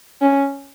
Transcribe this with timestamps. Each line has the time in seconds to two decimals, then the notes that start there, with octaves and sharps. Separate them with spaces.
0.22 C#4